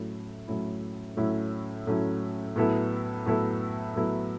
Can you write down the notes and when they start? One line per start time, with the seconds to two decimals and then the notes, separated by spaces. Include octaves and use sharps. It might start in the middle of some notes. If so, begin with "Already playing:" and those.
Already playing: A2 F#3 A3 C#4 E4
0.48 A2 F#3 A3 C#4 E4
1.17 A2 F#3 A3 C#4 E4
1.87 A2 F#3 A3 C#4 E4
2.56 A2 F#3 B3 E4 A4
3.26 A2 F#3 B3 E4 A4
3.96 A2 F#3 B3 E4 A4